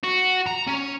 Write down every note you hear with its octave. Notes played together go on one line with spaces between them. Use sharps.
F#4
A#5
C#4